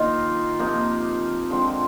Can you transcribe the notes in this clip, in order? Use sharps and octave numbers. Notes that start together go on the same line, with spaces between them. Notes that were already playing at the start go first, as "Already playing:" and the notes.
Already playing: D#3 A#3 D#4 F4
C3 F3 A#3 D#4
D3 F3 G#3 C4